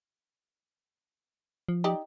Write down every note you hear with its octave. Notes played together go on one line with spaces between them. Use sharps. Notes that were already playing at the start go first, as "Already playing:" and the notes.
F3
D#4 G4 D5